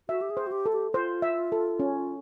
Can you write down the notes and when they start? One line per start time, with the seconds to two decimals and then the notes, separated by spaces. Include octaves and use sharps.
0.09 F#4 E5
0.22 G4
0.30 G#4
0.37 C5
0.47 F#4
0.52 G4
0.66 A4
0.73 G4
0.94 F4 C5
1.22 E5
1.52 A4
1.80 C#4